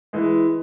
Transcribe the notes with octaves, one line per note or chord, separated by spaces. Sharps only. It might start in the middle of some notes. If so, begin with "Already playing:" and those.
E3 G#3